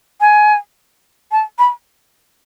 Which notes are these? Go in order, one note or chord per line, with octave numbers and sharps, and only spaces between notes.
G#5
A5
B5